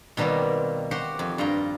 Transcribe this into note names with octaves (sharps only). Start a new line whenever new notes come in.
B2 D#3 G3 A#3 C4
F#4 G4 C5 F#5
F2
G2 F4 G5 A#5